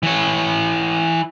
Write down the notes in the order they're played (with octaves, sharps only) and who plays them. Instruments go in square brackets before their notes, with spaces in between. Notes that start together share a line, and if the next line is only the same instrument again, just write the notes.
[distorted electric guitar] E3 C#5